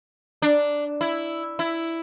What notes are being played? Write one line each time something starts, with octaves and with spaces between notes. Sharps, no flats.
D4
E4
E4